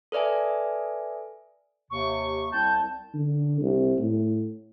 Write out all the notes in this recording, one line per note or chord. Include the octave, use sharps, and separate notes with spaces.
A4 B4 D5 E5 G#5
D#2 C3 C#6
C2 C4 A5 G6
D3
C2
A2